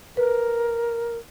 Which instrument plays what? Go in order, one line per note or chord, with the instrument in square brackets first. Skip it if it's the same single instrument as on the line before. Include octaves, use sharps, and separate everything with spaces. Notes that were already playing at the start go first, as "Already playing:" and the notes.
[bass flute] A#4 [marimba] B4